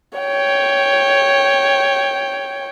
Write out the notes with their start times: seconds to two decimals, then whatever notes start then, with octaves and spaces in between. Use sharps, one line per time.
0.19 C#5 G5